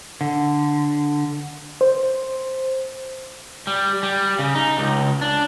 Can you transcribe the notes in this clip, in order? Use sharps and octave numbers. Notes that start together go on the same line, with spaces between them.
D3
C5
G3
G3
C#3
D#4
C#2
D4